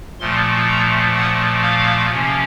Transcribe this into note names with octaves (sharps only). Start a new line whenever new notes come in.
A#2 F3 A3 C6
A#5
F#5
F5
C3 F3 A#3 C#4